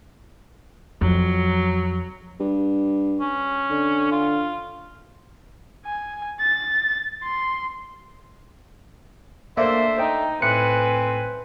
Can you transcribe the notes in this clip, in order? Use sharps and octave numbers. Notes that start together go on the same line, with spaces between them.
F2 F#3
G2
C#4
D3
F4
G#5
A6
C6
A3 A#3 D4 A4 C5 E5
D#4 G5
A2 C4 B4 G#5 F#6 C#7